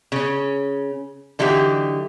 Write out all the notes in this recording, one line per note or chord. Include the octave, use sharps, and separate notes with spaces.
C#3 C#4
D3 E3 F#3 D#4 G4